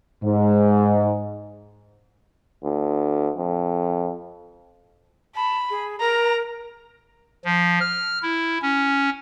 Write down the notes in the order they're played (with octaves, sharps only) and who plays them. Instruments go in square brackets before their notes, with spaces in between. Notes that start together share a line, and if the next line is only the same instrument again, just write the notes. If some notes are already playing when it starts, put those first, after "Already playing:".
[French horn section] G#2
[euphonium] D2
F2
[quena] A5 [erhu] B5
[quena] G#4
[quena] A#4 [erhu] A#5
[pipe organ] F3
F6
E4
C#4